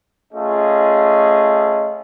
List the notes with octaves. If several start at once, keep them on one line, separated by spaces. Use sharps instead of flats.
A3 C#4 F4 G#4 D#5